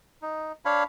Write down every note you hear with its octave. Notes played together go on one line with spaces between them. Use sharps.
D#4
D4 C#5 F5 B5